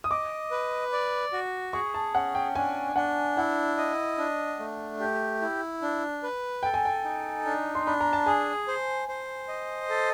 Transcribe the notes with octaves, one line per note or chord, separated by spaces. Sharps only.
D#6
D#5 D6
B4
D5
F#4
G#4 C#6
A5
C#4 F#5
G5
D4 G#5
D4 F#5
E4 F#5
D#5
D4
A3
G4
E4
D4
B4
A4 G5
G#5
G5
D#4
D4
C6
D4 B5
A#5
A5
G#4 G#5
C5
C5
D#5
A4